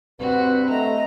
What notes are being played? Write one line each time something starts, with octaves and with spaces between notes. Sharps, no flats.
G2 C4 F#4 B4
A3 D#5 A#5